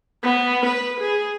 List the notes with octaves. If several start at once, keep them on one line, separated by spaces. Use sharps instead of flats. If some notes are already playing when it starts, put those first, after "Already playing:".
B3
B4
G#4